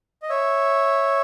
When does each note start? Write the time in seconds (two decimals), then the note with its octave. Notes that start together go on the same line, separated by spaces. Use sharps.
0.22 D#5
0.30 C#5 E5